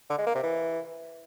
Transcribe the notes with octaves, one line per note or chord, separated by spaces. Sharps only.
D3
G#3
A#3
C3
E3